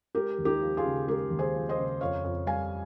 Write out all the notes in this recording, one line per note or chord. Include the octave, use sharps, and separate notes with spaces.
G#3 G4 A#4
D#2
D#4 G4
F3
F4 G#4
C#3
G#3 G4 A#4
D#2
G#4 C5
F3
C5 D#5
C#3
F2 C#5 F5
F2
G3 F5 G#5